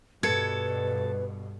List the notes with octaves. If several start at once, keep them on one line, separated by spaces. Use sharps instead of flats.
G2 B2 A4 B4 G#6 C#7